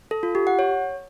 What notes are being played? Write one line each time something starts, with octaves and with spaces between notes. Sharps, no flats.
A4
F4
G4
F#5
C#5